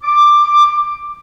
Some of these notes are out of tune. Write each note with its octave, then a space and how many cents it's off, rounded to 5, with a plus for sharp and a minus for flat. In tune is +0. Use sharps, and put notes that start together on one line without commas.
D6 +10